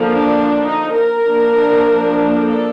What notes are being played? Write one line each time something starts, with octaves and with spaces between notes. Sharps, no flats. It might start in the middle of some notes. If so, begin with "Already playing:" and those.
Already playing: D3 F3 A#3
D4
D#4
A#4
F3 A#3 D4
A4